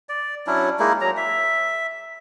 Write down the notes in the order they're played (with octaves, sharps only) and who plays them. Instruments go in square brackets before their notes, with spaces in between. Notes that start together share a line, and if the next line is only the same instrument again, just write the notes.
[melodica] D5
F#3 C#4 D4 E4
G#3 A#3 D#4 E4
F#3 A#5
E5